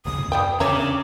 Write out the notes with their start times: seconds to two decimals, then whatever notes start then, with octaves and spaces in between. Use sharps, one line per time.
0.05 A1 D#2 C#3 D#6
0.20 D#2 G#2
0.32 F#2 E3 G3 G5
0.60 E2 C#3 C#5 E5 A#5 D6
0.72 D4